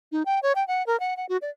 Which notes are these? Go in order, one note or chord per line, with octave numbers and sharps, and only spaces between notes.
D#4
G5
C#5
G5
F#5
A#4
F#5
F#5
F#4
D5